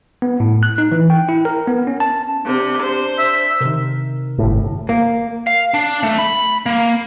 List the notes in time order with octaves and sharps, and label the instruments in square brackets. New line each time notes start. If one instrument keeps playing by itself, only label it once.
[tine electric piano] B3
A2
F#6
D#4
E3
G5
E4
A#4
B3
C#4
A5
[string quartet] C3 [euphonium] D4
[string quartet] C5
[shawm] E5
[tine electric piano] C3 [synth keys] D#3 A#4
[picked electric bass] G1 A2
[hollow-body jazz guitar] A#3
[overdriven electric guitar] F5
D4
A3
B5
A#3